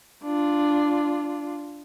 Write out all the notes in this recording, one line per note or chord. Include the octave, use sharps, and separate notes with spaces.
D4 F4